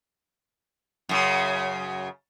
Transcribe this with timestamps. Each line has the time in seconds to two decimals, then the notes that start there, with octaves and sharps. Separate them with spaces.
1.09 F#2 C#3